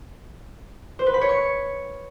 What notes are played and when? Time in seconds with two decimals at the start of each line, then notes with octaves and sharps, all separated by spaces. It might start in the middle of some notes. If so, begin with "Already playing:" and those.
0.99 C5
1.06 B4
1.14 B5
1.21 C#5
1.29 C#6